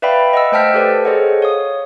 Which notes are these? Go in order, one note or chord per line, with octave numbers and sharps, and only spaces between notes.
B4 D5 E5 F5 G5 B5
D#5 F#5 E6
A3 C5 G5 A5 F6 B6
G4 A4 B4 C5 D5
G#4 A4 C5 C#5 D#5 F#5
C#5 F5 D#6